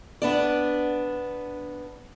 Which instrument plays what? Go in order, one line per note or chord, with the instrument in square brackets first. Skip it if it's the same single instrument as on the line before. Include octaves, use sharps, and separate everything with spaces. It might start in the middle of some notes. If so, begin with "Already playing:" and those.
[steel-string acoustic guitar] B3 D4 D5